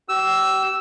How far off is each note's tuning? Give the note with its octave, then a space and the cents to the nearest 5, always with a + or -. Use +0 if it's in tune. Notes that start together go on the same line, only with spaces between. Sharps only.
G4 -40 E6 +0